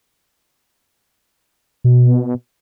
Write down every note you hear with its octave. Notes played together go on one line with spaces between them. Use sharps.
B2